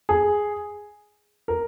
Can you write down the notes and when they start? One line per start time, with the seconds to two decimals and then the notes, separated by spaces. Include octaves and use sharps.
0.09 G#4
1.48 A#4